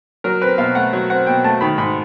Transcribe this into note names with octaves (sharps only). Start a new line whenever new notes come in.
F#3 A#4
C4 B4
B2 F5
A3 F#5
F#3
C4 F#5
B2 G5
A3 A5
D#3 B5
G#2 B5